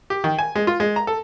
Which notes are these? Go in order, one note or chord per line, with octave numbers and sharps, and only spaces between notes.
G4
D#3
G#5
G#3
F4
G#3
A#5
A4